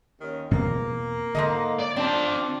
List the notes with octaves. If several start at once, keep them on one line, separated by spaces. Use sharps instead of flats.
D#2 D#3 C#4
E2 B2 A#3 C4
G#2 D3 A4 D#5
D5
C4 D4 F4 D5 A5